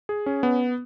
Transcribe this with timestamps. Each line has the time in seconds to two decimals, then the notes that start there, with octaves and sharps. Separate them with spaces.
0.09 G#4
0.26 C#4
0.43 B3